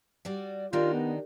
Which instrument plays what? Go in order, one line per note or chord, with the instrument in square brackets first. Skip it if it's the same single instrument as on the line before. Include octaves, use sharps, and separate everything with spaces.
[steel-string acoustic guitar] G3 F#4 D5
[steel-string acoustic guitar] D#3 D4 D#4 [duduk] F4 [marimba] G4 A#4 D5
[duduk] B3